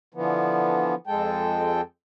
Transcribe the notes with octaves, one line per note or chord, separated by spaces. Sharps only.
D3 E3 F3 B3
F2 G#3 A4 G5